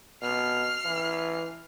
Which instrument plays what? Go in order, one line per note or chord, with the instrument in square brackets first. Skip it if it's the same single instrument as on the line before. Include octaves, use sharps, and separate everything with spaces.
[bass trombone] B2 [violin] F6 C7
[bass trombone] E3